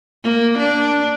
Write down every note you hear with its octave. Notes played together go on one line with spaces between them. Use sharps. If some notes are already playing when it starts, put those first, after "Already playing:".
A#3
D4